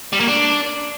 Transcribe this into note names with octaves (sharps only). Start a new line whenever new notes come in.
G3
A#3
D4